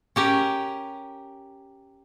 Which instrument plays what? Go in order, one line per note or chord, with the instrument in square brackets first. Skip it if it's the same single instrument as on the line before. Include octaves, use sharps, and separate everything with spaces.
[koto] C#4 G4 A#4